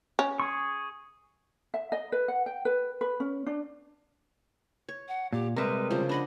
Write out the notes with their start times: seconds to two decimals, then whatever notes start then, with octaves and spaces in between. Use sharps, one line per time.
0.19 C#4
0.40 G#4 C#6
1.74 E5
1.92 D#5
2.12 B4
2.28 F#5
2.46 G5
2.65 B4
3.01 B4
3.20 C#4
3.46 D4
4.89 C#5
5.08 F#5
5.33 A#2 G4
5.56 C3 G3 G#3 A#4 B4 E5
5.91 C#3 F3 C5
6.09 D4 D#5 F#5 B5